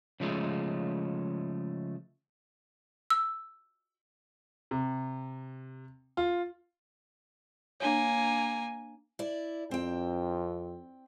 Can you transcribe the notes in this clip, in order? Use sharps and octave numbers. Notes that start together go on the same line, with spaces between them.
C#3 F3 G#3 A3
E6
C3
F4
A#3 D4 C#5 G#5
E4 D5
F2 C4 G5